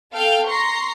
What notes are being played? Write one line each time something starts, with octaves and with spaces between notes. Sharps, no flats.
A4 F5 G5 F6 G6
A#5 C6 C#6 A#6 C7